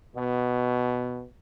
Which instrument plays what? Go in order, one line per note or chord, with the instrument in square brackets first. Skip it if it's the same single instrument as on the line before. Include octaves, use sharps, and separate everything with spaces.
[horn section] B2